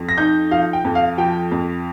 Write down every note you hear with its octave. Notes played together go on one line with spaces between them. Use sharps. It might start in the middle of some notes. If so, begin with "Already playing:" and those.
Already playing: F2
A#6
D#4 G6
F3 F5
G5
F2
F5
F3 G5
F2